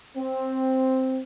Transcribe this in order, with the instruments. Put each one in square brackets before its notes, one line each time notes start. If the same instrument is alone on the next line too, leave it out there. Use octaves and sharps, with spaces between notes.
[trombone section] C4